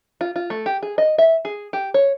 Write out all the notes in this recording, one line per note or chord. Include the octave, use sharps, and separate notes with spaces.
F4
F4
A3
G4
G#4
D#5
E5
G#4
G4
C#5